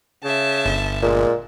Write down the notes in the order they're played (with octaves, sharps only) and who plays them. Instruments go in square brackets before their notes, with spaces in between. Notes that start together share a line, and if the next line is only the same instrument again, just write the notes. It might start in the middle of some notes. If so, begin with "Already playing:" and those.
[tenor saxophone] C#3 [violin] E5 A5
[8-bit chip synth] G1
[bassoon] A#2 [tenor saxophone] G#3